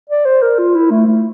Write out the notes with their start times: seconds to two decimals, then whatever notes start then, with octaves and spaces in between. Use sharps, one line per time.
0.10 D5
0.25 C5
0.42 A#4
0.58 F4
0.75 E4
0.91 A3
1.07 A3